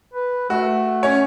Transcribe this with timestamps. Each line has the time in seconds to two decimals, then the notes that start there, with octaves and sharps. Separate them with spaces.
0.14 B4
0.50 A3 F#4
1.03 C#4 C#5